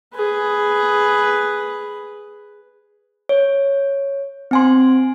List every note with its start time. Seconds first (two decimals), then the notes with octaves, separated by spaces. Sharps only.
0.14 G#4 B4
3.29 C#5
4.51 C4 G#5 C6